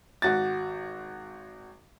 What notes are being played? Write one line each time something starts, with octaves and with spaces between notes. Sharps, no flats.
G#1 F#4 A6